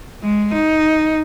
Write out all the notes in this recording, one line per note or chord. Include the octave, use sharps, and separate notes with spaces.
G#3
D#4